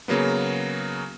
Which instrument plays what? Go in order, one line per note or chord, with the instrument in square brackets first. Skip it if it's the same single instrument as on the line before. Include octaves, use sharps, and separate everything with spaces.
[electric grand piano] C#3 F#3 A#3 B3